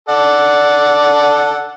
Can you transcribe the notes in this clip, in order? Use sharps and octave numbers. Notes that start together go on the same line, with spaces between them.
A4 D5 F#5